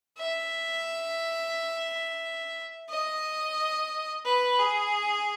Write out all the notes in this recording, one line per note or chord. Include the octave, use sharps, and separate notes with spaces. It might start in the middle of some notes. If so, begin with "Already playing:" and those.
E5
D#5
B4
G#4